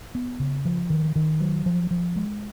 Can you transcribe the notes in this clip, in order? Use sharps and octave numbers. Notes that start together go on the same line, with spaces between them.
B3
C#3
F3
D#3
D#3
F#3
F3
F3
G#3